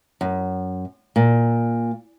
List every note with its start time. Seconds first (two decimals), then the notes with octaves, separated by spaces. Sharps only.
0.21 F#2
1.16 A#2